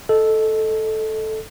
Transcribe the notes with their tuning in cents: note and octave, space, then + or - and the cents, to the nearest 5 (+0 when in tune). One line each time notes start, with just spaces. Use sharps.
A4 -5 D#5 +0